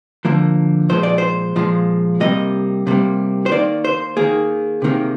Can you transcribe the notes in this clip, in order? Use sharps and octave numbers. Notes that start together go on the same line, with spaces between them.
D3 F3 A#3
A#2 F3 G#3 C5
D5
C5
A#2 F3 G#3
C3 G3 A#3 D#5
C3 G3 A#3
C5
D#3 A#3 D5
C5
D#3 A#3 G#4
C3 D#3 A#3